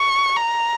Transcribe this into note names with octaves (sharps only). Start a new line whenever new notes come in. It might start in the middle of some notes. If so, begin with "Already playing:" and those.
Already playing: C#6
A#5